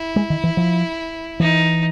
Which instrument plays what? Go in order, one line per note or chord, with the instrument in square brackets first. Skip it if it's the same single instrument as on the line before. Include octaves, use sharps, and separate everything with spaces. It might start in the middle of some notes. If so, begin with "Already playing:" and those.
Already playing: [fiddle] E4
[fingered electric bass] G#3
D#3
E3
F3
[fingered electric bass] E3 [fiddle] D#4